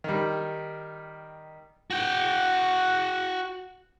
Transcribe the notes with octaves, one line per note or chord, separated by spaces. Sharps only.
D#3 G3
F#4 G5